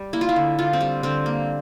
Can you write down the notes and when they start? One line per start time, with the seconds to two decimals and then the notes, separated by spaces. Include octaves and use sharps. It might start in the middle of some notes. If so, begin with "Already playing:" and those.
Already playing: G3
0.13 A#3 E4
0.21 F4
0.29 E4
0.36 D3
0.59 D3 F4
0.73 C4
0.81 G3
1.03 D3 C4
1.26 A#3